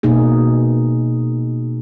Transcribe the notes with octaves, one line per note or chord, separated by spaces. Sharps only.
B2 A#3 D#4 G#4